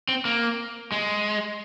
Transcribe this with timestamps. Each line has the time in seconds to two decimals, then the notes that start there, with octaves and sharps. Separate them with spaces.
0.09 C4
0.25 A#3
0.92 G#3